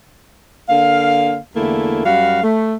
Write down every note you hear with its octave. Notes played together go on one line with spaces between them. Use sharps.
D3 A#3 F5
E2 D3 A3 A#3 E4
F#2 G3 F#4 F5
A3